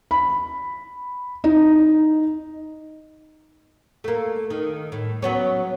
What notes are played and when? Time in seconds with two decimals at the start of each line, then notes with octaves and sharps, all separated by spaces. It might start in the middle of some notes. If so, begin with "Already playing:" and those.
0.11 B5
1.44 D#4
4.04 A3 A#3
4.50 D#3
4.92 A2
5.22 F#3 B3 C#4